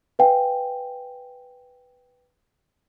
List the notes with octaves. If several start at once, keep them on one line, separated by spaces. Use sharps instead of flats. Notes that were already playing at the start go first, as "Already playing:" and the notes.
B4 F5 G5 G#5